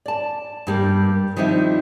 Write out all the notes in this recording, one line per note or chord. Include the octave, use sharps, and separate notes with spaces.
D5 A5
G2 G3 A#3
D#3 F3 G3 C4 D#4 E4